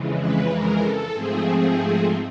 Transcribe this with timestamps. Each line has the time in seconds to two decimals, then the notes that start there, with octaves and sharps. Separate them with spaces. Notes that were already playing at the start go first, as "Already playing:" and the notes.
Already playing: F2 C#3 E3 G#3
0.18 B4
0.50 A#4
0.81 A4
1.13 G#2 F3 A3 C4 G#4